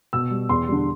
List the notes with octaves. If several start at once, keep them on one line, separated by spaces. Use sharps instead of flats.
B2 E6
G3
E2 C6
D3 G3